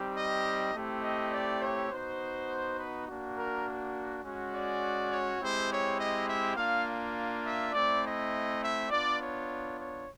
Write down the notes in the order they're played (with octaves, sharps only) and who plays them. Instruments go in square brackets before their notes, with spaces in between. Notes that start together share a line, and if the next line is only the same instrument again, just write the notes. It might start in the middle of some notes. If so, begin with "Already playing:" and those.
Already playing: [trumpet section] G3 C4 D#4 G4
D#5
A3 C4 E4 G4
D#5
D5
C#5
B3 D#4 F#4 C5
B4
A#3 D4 F#4
A#4
G#3 C#4 F#4
D5
C#5
G#3 C4 E4 G4 C5
C#5
D#5
E5
A#3 D4 F4 F5
E5
A3 C4 E4 D5
D#5
E5
B3 D4 F4 D5
C#5
C#5